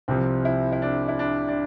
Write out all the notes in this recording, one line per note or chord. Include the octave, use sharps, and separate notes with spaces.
C2 C3 F3 C4
E4
E4
D4
E4
D4
D4